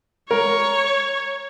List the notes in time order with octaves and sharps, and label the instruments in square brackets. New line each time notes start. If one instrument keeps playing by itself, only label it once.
[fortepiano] A#4 [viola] C#5